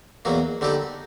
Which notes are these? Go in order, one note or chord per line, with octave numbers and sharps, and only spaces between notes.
E2 B2 F#3 A#3
D3 G3 C4 D#4 G4